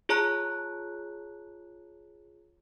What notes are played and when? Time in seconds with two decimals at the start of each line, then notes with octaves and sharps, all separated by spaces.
0.09 F4 G#4 C#5 A5 A#5 F#6